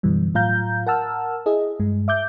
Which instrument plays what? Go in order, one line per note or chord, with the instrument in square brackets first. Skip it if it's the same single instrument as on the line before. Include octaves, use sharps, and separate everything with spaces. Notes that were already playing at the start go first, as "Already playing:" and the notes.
[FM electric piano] F#2 B2 D3 E3 G3
A2 F#3 F4 F5 A#5 G6
A#4 F#5 A5 E6 F6
E4 G#4 D#5
G2 G#3
E5 D6 G6